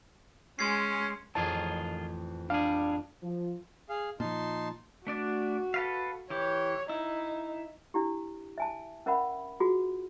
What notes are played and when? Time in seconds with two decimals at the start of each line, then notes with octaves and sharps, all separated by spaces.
0.59 G#3 C#4 C6 G#6 C7
1.35 A1 F2 D#3 F4 G#4 A5
2.50 G3 D4 G#4 F5
3.23 F3
3.89 G#4 F5
4.20 A#2 F3 D#4 A5 C6
5.07 A3 D4 F#4 D5
5.74 A4 B4 F5
6.30 E3 G4 C#5
6.89 D#4 E4
7.94 D4 E4 G4
8.58 E5 G#5 A5
9.06 C#4 A#4 E5 F#5 B5
9.60 F4 F#4 G#4